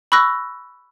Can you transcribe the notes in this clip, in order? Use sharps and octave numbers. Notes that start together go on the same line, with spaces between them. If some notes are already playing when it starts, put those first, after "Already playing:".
B5 C#6 E6 F#6 A#6